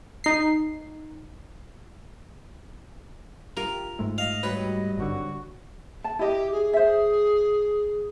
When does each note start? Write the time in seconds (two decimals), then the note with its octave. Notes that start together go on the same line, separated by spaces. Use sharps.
0.24 D#4 C7
3.57 F4 G4 A#4
3.99 G#2 G#3 A3
4.18 D#5 F5
4.43 F#3 G3 B4
4.97 G#1 G2 D3 F#4
6.04 A5
6.19 E4 G4 D#5
6.51 G#4
6.73 C5 E5